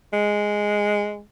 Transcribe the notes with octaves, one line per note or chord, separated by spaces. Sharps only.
G#3